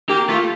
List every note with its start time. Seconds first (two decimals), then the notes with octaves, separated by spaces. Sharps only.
0.09 A#3 G4
0.29 A3 F4